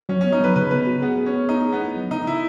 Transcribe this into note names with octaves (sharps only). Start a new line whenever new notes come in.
F#3 C#4
C#4
B3
D#4
F#3 B4
C#3 B4
B3 B4
F#4
B3 G#4
G#4
C#4
B3
B3 D#4
G#4
B3
E4
F#3
C#3 D#4
C#3 E4